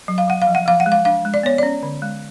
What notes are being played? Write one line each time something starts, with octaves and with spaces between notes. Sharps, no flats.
F#3
F5
F#3 F#5
F5
F3
F#5
F3 F5
F#5
G#3
F5
D4 F5
G#3
D5
B3 C#5
C#4 D5
D3
G#3